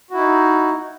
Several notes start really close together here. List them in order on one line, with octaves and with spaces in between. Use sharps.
F#4 E4 D#4